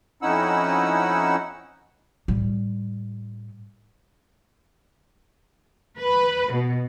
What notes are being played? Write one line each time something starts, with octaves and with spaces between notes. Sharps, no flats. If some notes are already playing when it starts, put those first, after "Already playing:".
F2 C#4 D#4 E4 F#5 E6
A2 G3
B4
B2